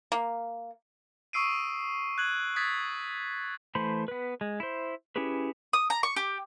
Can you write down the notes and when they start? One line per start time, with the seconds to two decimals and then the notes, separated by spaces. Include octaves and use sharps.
0.12 A#3
1.33 C#6 D#6 E6 C7 D7 D#7
2.18 F#6 G#6 F#7
2.56 D#6 G#6 A6 B6
3.75 E3 A3 C5 B5 C6
4.08 B3 B4
4.41 G#3
4.60 E4 C5
5.16 C#4 E4 G4 G#4 B4
5.73 D#6
5.90 A#5
6.03 C#6
6.16 G4